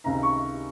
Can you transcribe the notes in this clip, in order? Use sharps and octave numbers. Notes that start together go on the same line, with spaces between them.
C#2 C3 D#3 A#5
C#6